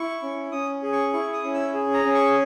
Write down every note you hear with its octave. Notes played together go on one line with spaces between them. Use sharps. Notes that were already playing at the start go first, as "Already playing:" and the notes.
Already playing: E4 C#6
C#4
C#4 D#6
G#4
C#6
E4 C#6
D#6
C#4
E6
G#4
A#5
C#4
C#6